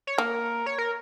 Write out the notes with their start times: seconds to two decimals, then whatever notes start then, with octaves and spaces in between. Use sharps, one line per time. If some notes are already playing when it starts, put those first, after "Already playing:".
0.07 C#5
0.18 A#3 A#4
0.66 C#5
0.78 A#4